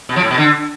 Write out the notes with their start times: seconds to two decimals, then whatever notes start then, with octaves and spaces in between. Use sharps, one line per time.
0.09 B2
0.16 F3
0.23 A2
0.31 B2
0.38 D3